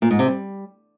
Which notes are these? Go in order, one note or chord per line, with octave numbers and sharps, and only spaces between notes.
A#2
G#2
C3
G3